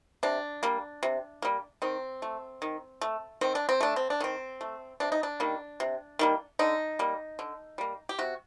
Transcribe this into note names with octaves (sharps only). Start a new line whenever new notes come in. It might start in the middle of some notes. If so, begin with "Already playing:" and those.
C3 D4
G3 A#3
C3
G3 A#3
D#3 C4
A3
D#3
A3
D#3 C4
D4
C4
A3 D4
C4
D4
D#3 C4
A3
C3 D4
D#4
D4
D#3 G3 A#3
C3
D#3 G3 A#3
D3 D#4
G3 A#3
D3
G3 A#3
G4
C3 F#4